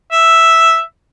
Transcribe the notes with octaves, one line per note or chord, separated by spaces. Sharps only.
E5